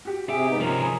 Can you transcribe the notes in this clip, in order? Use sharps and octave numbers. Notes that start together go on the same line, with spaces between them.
F#4 G4
C3 G4 G#4 E5
G#2 B3 D#4
C3 F3 C#4 A#4
G#4 A#5 B5